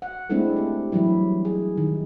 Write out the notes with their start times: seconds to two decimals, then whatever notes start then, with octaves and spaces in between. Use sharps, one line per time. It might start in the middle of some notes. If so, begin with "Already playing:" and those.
0.02 F#5
0.29 G#3 A3 C4 D4 E4 A4
0.57 G4
0.92 E3 F#3 G3 E4
1.45 G#4
1.77 D#3